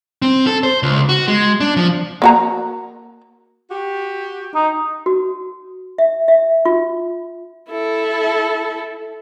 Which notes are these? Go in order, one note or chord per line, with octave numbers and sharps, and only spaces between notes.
C4
A4
C5
C#2
F#4
G#3
D4
F3
A#3 F#4 A#5
F#4 G4
D#4
F#4
E5
E5
F4
E4 A4